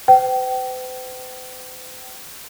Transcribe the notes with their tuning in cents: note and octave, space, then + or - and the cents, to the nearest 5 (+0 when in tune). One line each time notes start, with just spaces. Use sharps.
C5 -45 G5 -35